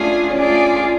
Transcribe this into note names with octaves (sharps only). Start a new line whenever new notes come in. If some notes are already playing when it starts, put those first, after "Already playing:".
Already playing: A3 C#4 D4 F4 G#4
C#4
A3 D4 F4 G#4 D5